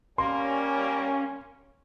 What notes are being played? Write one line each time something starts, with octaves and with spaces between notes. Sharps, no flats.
G3 A#3 C#4 C6